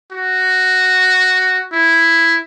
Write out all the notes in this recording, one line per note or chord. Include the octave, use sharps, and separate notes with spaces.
F#4
E4